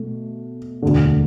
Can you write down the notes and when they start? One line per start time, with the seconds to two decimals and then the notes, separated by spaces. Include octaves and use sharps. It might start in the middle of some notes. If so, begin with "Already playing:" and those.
Already playing: B2 A3
0.82 E1 D2 D3